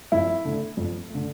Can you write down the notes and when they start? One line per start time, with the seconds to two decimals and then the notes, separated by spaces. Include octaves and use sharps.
0.12 F2 E4
0.45 D3 A3
0.77 F2
1.10 D3 A3